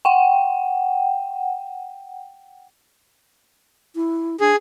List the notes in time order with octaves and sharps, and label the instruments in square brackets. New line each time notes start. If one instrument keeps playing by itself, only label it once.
[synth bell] F#5 G5
[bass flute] E4
[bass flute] D4 [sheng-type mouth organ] G#4